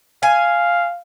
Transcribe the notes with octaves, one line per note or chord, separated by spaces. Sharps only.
F5 G#5